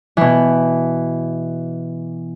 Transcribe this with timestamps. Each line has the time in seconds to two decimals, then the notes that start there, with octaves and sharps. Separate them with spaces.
0.17 B2 E3